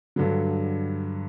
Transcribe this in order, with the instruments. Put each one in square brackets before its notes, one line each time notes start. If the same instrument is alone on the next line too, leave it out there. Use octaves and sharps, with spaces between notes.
[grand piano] G2 D3 F#3